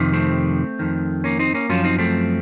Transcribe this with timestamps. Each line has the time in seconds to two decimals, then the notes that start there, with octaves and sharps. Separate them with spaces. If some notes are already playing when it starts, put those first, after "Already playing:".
Already playing: F2 C3 D#3
0.13 A3 C4
0.79 F2 D#3
1.24 A#3 C#4
1.39 C4 D#4
1.54 A#3 C#4
1.69 F#2 F3 C#4 F4
1.84 C4 D#4
1.98 A3 C4